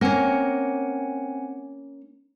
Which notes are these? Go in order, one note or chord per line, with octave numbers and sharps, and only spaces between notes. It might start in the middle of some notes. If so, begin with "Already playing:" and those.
A#3 C4 C#4 F#5 G#5